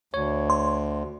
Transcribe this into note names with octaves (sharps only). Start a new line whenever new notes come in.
D2 C#5
C6